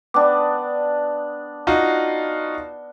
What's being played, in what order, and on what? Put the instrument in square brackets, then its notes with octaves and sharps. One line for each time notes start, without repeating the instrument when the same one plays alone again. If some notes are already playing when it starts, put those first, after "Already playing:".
[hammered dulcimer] B3 D4 [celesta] D5 G5 D6
[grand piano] D#4 F4 F#4